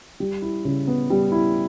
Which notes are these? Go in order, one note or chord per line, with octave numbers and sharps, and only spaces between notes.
G3
E4
C#3
B3
G3
E4